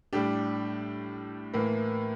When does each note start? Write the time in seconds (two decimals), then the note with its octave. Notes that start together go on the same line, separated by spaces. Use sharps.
0.13 A2 G3 D4 G4
1.54 A2 E3 A#3